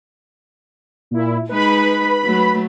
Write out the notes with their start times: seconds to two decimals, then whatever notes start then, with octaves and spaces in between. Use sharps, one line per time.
1.11 A#2 E4
1.49 G#3 D#4 B4 B5
2.24 F#3 A3